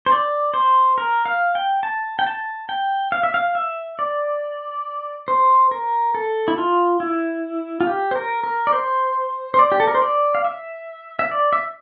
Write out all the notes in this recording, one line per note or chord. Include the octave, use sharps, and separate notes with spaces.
C5
D5
C5
A#4
F5
G5
A5
G5
A5
G5
F5
E5
F5
E5
D5
C5
A#4
A4
E4
F4
E4
F4
G4
C5
A#4
A#4
D5
C5
C5
D5
G4
A4
A#4
C5
D5
F5
E5
E5
D5
E5